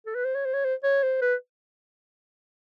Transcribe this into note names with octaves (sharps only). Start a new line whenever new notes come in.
A4
B4
C5
C#5
C5
C#5
C5
C#5
C5
B4